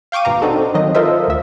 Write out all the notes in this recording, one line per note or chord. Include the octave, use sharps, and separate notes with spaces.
F5 G5 C#6 D6 D#7
G#1 B2 F5 A#5
C4 D4 D#4 F#4 A4
D#3 F#3 C4 D#5
F4 A4 A#4 C5 D#5 E5
D2 E5